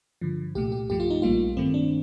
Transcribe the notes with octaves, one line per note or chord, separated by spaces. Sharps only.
G2 D3 F3
C2 A#2 A3 G4
G4
G2 F3 A3 G4
F4
D#4
A#1 A2 G3 A#3 F4
G2 D#3 A3 C4
D4